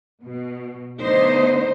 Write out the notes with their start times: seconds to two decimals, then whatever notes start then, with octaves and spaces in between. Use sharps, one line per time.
0.24 B2
1.01 D3 A3 B3 D4 D#4 C5